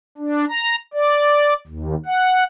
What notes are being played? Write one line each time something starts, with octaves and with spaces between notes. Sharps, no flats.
D4
A#5
D5
D#2
F#5